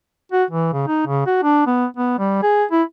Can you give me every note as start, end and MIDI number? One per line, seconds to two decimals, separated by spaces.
0.32 0.44 66
0.51 0.72 52
0.73 0.83 49
0.88 1.04 63
1.07 1.26 49
1.27 1.39 66
1.43 1.66 62
1.67 1.86 59
1.97 2.16 59
2.19 2.39 55
2.43 2.65 68
2.71 2.83 64